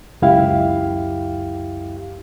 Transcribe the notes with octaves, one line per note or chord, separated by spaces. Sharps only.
C#2 F#2 E4 G4 F5